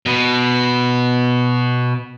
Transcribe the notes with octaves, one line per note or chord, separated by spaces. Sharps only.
B2 B3